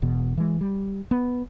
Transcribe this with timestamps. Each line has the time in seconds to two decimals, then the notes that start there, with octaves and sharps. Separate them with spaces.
0.02 E1 E2 B2
0.38 E3 G#3
0.61 G3
1.11 B3